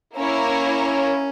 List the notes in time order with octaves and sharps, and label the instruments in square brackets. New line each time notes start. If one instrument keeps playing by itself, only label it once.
[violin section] A#3 E4 A#4 C#5 [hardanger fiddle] C#4
[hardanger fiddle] C#4